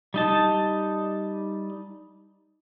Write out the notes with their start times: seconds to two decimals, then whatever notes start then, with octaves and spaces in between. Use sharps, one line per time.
0.14 G3 D#4 A5